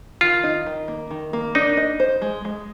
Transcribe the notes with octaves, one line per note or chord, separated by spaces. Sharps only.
D#3 F4
D#4
D#3
A#3
D#3
A#3
D4 D#4
D#5
C5
G#3
G#3